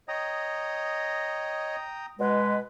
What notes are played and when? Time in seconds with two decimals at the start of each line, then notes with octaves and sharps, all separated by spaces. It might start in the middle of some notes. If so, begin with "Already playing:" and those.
0.08 C#5 D#5 G5 A#5 D#6
2.19 B2 G#3 B4